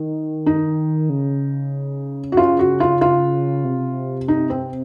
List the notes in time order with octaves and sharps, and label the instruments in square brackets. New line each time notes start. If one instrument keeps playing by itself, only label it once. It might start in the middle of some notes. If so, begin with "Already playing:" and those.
Already playing: [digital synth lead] D#3
[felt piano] D#4
[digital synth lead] C#3
[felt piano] F#4
[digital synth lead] C#3 [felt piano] F4
[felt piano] F#4
F4
F4
[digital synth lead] C3
[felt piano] D#4
C4